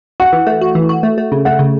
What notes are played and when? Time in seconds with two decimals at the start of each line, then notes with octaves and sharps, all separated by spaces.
0.20 F#4 F#5
0.33 E3
0.47 A3
0.61 F#4
0.75 E3
0.89 F#4
1.03 A3
1.18 A3
1.32 C#3
1.45 A3 F#5
1.59 C#3